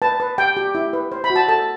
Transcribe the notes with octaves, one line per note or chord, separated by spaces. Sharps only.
B4 A5
B4
G4 G5
G4
E4
B4
C5
B5
F#4
A5
A4 A5